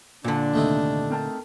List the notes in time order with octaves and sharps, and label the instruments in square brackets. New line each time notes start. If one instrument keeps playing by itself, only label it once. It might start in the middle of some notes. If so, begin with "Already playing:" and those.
[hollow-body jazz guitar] A#2 D3 [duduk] D4
[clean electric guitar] D#2 C3 [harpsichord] A3 D#4 E4
[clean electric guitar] C4 A#4 A5